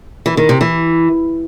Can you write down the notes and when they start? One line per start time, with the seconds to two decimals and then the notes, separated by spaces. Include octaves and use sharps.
0.26 E3
0.37 D#3
0.49 C3
0.61 E3